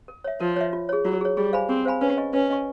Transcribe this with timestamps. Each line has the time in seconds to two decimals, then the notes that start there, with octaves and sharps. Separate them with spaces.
0.08 A#4
0.24 C#5 E5
0.40 F3 A#4
0.56 C#5 E5
0.73 F4
0.89 G#4 C#5
1.05 F#3 F4
1.21 G#4 C#5
1.37 G3 G#4
1.53 C5 F5 G#5 B5
1.69 C4 G#4
1.85 C5 F5 G#5 B5
2.01 C#4 B4
2.17 D#5 G#5 C#6
2.33 C#4 B4
2.49 D#5 G#5 C#6